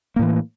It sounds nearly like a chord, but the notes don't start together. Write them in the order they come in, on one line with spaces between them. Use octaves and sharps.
A#3 A2 E3